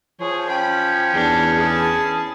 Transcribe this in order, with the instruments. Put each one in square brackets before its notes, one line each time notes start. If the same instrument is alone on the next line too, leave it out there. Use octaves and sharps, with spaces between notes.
[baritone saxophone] F3 [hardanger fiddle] G#4 [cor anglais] C#5
[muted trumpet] C#4 [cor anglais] G5 [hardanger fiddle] B5
[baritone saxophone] E2 [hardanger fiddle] D4 A4
[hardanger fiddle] E4 A5 [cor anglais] G#4